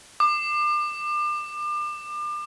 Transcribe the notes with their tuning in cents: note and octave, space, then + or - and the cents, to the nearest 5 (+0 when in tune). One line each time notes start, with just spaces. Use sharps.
D6 +35